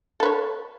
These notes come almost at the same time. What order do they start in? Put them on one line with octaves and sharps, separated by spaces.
A4 B4 C#5